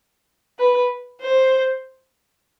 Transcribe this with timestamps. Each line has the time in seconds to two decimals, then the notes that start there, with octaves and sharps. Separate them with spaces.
0.59 B4
1.21 C5